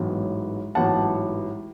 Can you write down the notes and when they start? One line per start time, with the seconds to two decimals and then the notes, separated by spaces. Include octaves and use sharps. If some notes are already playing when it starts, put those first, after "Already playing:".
Already playing: A1 G#2 F#3 B3
0.75 A1 G#2 F#3 B3 F#5 A5